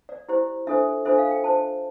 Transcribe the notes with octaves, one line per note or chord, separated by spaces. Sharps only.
D5
E4 G4 C5
D4 F4 A4 C5 E5
D4 F4 A4 C5 E5
F5
G5
F4 C5 A5